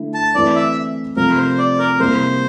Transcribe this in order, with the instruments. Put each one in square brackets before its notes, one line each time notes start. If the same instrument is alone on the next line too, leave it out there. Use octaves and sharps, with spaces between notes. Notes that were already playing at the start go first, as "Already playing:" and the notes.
Already playing: [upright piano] D3 A3 E4
[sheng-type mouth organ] A5
[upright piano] E3 A3 C4 E4 [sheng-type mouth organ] D5
[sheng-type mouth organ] E5
[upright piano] C3 F3 A3 C4 [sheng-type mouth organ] A#4
[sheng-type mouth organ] C5
D5
A#4
[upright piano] C3 G3 A#3 E4 [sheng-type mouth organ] C5